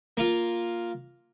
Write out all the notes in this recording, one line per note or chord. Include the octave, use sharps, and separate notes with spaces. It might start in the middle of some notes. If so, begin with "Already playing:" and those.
A#3 F4